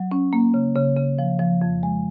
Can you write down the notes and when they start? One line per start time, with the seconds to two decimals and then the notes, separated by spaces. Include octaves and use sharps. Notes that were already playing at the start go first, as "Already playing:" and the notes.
Already playing: F#3
0.12 C#4
0.33 A#3
0.54 C#3
0.76 C#3
0.97 C#3
1.19 F3
1.39 F3
1.62 F2
1.83 G#3